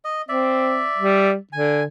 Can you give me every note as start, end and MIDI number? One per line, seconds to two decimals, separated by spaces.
0.05 0.22 75
0.29 0.85 60
0.29 1.31 74
0.29 1.31 76
0.98 1.37 55
1.53 1.85 50
1.53 1.84 80